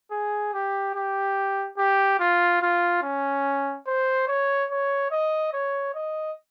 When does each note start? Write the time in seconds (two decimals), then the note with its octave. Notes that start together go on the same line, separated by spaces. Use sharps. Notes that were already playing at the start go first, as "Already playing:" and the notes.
0.11 G#4
0.53 G4
0.94 G4
1.78 G4
2.20 F4
2.62 F4
3.02 C#4
3.87 C5
4.27 C#5
4.70 C#5
5.11 D#5
5.53 C#5
5.94 D#5